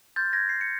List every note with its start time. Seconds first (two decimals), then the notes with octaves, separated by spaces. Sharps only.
0.16 C6 F6 G6 A6
0.33 G#6 A#6
0.49 C7
0.61 C#7